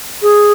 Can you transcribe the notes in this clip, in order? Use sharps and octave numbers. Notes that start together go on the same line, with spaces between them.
G#4